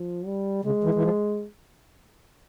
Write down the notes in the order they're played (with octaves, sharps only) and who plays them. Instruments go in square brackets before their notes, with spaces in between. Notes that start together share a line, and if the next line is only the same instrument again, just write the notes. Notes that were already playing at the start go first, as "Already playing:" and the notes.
Already playing: [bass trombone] F3
G3
[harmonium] C#3 [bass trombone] G#3
[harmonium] E3
E3
F3